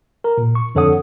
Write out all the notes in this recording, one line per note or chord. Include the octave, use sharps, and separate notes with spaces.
A#4 A#5
A#2
C#6
F2 D3 A4 C#5 F#5 D#6